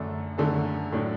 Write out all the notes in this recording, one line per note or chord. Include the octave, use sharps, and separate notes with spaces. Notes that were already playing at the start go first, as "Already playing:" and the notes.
Already playing: F#2 D3 A3 D4 A4
F#2 D3 A3 D4 A4
A2 F#3 D4